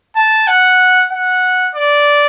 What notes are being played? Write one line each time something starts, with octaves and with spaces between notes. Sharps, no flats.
A5
F#5
F#5
D5